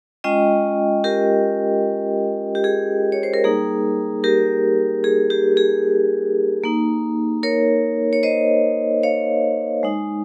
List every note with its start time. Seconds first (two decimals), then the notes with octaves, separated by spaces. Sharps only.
0.24 G#3 C#4 F4 D#5 G5
1.04 G4 A#4
2.55 G4
2.64 G#4
3.12 C#5
3.23 C5
3.34 A#4
3.44 G3 A#3 D#4 G#4
4.24 G4 A#4
5.04 G#4
5.30 G4
5.57 G#4
6.64 A#3 D#4
7.43 A#4 C#5
8.13 C#5
8.23 C5 D#5
9.03 C#5 F5
9.83 G#3 D#4